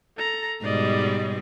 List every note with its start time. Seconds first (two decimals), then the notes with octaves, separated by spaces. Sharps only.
0.17 A4 A#5
0.63 G#2 B2 G3 D5 D#5